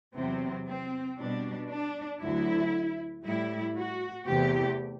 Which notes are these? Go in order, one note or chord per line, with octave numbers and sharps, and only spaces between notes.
E2 C3 F#3 C4
C4
B2 G3 D4
D4
D2 D3 F#3 E4
A2 G3 E4
F#4
E2 C3 E3 A3 G4